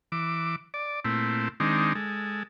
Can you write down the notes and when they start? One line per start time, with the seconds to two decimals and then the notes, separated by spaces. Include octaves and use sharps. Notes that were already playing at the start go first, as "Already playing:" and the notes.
0.12 E3 D6
0.74 D5
1.05 A#2 A3 C4 E4
1.60 D#3 G#3 C4 D4 D#4
1.95 G#3 A4